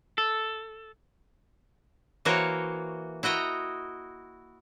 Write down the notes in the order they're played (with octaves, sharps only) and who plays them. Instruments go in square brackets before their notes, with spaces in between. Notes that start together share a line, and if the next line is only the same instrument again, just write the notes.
[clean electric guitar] A4
[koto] E3 A#3 F#4 A#4 C5 C#5
E4 F#4 D#5 G5 A#5